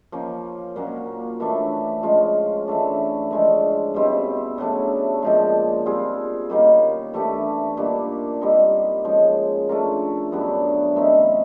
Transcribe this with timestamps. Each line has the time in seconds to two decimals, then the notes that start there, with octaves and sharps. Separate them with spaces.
0.12 F3 A#3 C#4
0.76 A#2 F#3 A#3 C#4
1.40 E3 A3 D4
2.03 F3 G#3 C#4 F4
2.68 E3 A3 D4
3.31 D3 F3 G#3 C#4
3.94 B2 G3 C4 E4
4.58 C#3 F#3 A3 D4
5.22 A#2 F3 G#3
5.86 G3 C4 F4 G#4
6.50 D#3 G3 A#3 C#4
7.14 E3 A3 D4 G4
7.77 A#2 G3 A#3 D4
8.41 G3 C4 D#4
9.05 C#3 F3 G#3
9.69 A3 D4 F4 A#4
10.32 F#2 D3 G3 B3
10.96 E3 A3 C4 D#4